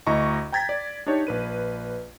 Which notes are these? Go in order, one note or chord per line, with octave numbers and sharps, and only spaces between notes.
D2 E4 D#5 A#5 C#6
G5 A#5 G#6 A6 B6
D5
D4 D#4 G4 C#5 D5
A#1 B4 D#7